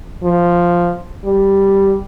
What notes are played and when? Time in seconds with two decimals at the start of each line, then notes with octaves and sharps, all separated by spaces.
0.24 F3
1.25 G3